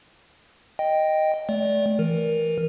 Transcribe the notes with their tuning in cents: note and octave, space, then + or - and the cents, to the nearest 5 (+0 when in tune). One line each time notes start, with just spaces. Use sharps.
D#5 +0 G5 +0
A3 -30 D5 -25
E3 +0 A#4 +0